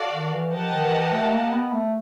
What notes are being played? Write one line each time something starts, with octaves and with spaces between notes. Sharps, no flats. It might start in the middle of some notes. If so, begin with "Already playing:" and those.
Already playing: F#4 A4 D5 F5
D#3
E3
F3 G4 A#4 D#5 F#5 A5
D#3
E3
A3
A#3
B3
A3